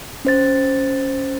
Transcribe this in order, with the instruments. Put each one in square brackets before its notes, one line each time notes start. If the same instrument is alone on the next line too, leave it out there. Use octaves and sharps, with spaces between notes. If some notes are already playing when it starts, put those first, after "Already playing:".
[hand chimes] C#4 C5 A6